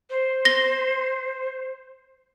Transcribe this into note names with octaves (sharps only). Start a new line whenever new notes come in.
C5
A#6 G7